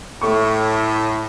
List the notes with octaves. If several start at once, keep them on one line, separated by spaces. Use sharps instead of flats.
A2 A3 C#6